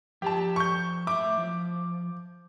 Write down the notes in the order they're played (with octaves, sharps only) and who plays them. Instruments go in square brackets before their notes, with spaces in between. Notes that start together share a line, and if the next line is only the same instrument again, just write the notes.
[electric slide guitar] F3 A#5 [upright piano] G4 A5
[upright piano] C#6 G6
[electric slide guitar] A2 E5 [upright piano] D6
[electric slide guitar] F3